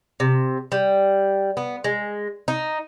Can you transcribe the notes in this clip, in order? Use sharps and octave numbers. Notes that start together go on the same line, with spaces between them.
C3
G3
B3
G#3
D#4